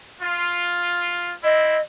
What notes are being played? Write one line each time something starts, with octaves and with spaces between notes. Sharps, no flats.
F4
C4 E4 D#5